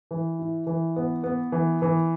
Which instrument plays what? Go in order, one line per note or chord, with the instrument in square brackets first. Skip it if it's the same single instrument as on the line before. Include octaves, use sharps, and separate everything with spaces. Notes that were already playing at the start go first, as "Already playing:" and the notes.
[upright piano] E3
E4
E3
B3
B3
E3
E3